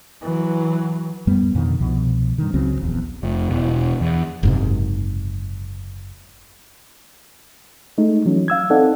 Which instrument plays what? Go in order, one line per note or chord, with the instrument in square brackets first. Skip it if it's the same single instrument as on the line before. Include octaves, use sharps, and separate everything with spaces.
[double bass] E3 F#3
[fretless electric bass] F#2 G3 B3
F2 B2 D3 D#3
C2 B2 F3
G2 D#3
C#2 C#3 F#3 C4
D#1 A#1 E2
[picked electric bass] F1
E1
E2
[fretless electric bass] F#1 G#2 C3
[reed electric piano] G#3 A3 D#4
E3 F#3 C#4
F5 E6 G#6
C4 D#4 A4 D5 F#5